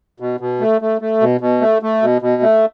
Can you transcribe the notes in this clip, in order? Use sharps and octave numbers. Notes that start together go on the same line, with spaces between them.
B2
B2
A3
A3
A3
B2
B2
A3
A3
B2
B2
A3